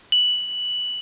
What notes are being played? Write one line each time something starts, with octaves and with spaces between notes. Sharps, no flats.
F#7